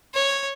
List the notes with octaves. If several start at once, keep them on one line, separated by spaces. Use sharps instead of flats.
C#5